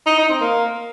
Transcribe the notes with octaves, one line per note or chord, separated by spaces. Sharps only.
D#4
D#4
C4
A#3